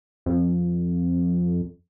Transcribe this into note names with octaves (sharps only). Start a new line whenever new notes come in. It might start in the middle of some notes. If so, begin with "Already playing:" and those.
F2